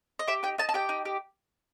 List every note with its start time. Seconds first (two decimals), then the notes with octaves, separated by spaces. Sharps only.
0.19 D#5
0.27 G4 E5
0.43 D#4 G5
0.58 D#4 A5
0.69 A5
0.74 G4 G5
0.89 D#4
1.05 G4